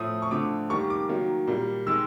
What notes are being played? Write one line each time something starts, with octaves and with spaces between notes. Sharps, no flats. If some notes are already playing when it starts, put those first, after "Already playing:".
Already playing: A2 F3 A3 D#6
C#6
D3 F3 A3 D6
D#3 G3 A#3 C#6
D6
D#3 F#3 A#3
A#2 G3 A#3
D#3 G#3 E6